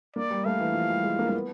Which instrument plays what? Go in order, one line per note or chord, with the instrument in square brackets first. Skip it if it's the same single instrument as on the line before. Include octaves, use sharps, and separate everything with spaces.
[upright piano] A#3 [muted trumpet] D5
[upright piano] G3
[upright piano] A3 [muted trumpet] F5
[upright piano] E3
F3
G3
G#3
A#3
A#3
B3